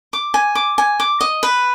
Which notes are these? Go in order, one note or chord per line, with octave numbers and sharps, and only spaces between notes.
D6
G#5
D6
G#5
D6
D#5
B4